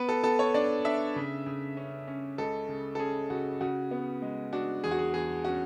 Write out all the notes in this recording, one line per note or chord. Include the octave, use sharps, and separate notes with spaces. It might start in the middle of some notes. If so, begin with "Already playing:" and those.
Already playing: B3 B4
A4
B3 A4
C#5
D4 D5
D4 E5
C#3
C#3
C#4
C#4
C#2 A4
C#3
A4
C#4 G#4
C#3 F#4
C#3 F#4
B3
G#3
D4 F#4
E2 G#4
F#4
G#4
E2 G#4
C#4 F#4